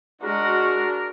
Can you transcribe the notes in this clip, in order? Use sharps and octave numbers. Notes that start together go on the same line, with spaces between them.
G#3 D4 F#4 A#4